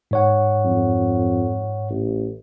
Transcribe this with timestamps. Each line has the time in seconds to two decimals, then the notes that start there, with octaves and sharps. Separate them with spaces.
0.11 G#2 C#5 F#5
0.65 F2
1.90 A1